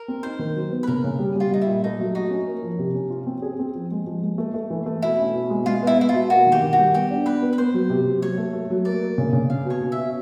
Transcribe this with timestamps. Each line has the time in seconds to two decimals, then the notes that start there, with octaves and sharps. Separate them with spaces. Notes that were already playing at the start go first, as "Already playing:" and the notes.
Already playing: A#4
0.08 C4
0.23 D#4 C5
0.39 D#3
0.55 F#3
0.71 B3
0.83 B4
0.87 C#3 A#4
1.04 C#3
1.19 G3
1.36 G3 F4
1.51 G3 D#4
1.62 E4
1.67 A#2
1.84 A3 D#4
2.00 F#3
2.15 D#4 F#4
2.31 C#4
2.47 A#3
2.63 F3
2.78 C3
2.95 C#4
3.10 F4
3.27 C4
3.42 G#4
3.59 C4
3.75 F3
3.91 G#3
4.06 F3
4.23 G#3
4.38 A3
4.54 A3
4.70 E3
4.86 A3
5.02 B2 E4
5.19 C#4
5.34 B2
5.50 G#3
5.66 G#3 F4
5.82 B3 E4
5.99 G#3 E4
6.09 F4
6.14 B2
6.30 A#3 F#4
6.47 D#3
6.52 G4
6.62 D#3
6.73 F#4
6.78 G3
6.95 B3 G4
7.10 D4
7.26 B3 B4
7.42 B3
7.53 B4
7.58 B3 C5
7.74 F#3
7.90 C3
8.05 F#3
8.22 F#3 C#5
8.38 A3
8.53 A3
8.70 F#3
8.85 A#3 D5
9.02 A#3
9.18 C#3
9.33 C#3
9.50 C#4 F5
9.65 B2
9.70 C#5
9.81 C#4
9.92 E5
9.97 B2